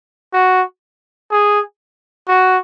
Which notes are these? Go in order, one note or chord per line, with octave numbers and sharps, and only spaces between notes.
F#4
G#4
F#4